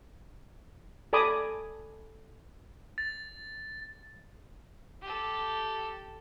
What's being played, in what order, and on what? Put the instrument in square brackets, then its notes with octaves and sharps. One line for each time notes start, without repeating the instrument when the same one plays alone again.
[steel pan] A4 D5 G#5 B5 D6 D#6
[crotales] A6
[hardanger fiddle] G4 A4